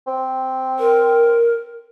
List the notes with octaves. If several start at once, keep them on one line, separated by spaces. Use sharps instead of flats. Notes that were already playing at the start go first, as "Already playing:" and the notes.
C4
A#4